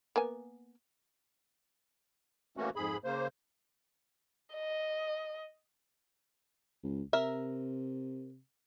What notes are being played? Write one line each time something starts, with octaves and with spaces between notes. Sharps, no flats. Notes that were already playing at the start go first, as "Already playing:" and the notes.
A#3 B3 G#5
E3 A3 A#3 C#4 F#4
F2 G#2 G#4 B5
C#3 A#3 C5
D#5
C#2
C3 A#4 E5